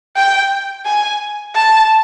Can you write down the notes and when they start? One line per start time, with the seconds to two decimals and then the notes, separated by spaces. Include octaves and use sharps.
0.16 G5
0.86 G#5
1.55 A5